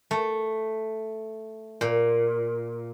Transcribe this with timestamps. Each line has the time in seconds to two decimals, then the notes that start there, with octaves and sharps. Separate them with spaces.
0.11 A3
1.81 A#2